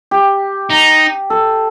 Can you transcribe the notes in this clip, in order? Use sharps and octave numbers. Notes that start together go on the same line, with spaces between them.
G4
D#4
A4